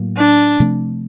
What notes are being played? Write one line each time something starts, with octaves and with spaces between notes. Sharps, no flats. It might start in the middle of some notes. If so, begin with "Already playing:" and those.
Already playing: A2 F#3 A#3
D4
C3 F3 A3 C4